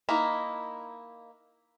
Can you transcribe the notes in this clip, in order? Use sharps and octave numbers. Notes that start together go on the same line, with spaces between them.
A#3 D#4 E4